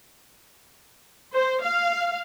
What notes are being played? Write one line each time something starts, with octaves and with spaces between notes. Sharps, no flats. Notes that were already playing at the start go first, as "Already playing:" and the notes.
C5
F5